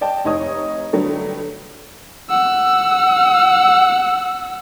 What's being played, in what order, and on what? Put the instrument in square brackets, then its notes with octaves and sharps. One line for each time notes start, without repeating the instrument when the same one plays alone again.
[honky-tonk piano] D5 D#5 G5 A5
F1 D#4 C#5 D#5 D#6
D3 F#3 G3 A3 B3
[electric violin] F#5 E6